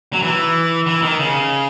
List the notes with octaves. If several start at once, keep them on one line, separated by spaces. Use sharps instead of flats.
F#3
E3
E3
D#3
C#3